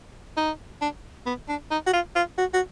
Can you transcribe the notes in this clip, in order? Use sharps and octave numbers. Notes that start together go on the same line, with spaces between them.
D#4
D4
B3
D4
D#4
F#4
F4
F4
F#4
F#4